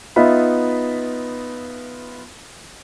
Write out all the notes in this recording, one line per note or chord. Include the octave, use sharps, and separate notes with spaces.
B3 D#4 F4 E5 B5